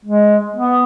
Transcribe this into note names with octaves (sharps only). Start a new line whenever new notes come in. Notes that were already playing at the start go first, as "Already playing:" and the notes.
G#3
B3